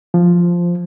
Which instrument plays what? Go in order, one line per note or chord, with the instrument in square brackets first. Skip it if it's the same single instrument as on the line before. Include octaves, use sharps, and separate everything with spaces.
[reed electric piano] F3